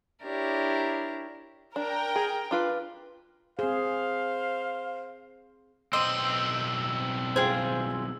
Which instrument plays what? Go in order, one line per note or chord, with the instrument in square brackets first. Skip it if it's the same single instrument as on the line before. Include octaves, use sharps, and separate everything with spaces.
[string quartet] D4 E4 G4 A#4 C#5
[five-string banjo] D4 [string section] A#4 G5
[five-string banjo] G#4
D4 F4 B4
[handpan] C4 G#4 [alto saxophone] C5 [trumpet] F5
[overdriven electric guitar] B1 C4 [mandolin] D#5 C6 [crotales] E6
[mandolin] F4 G#4 [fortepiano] C5 G5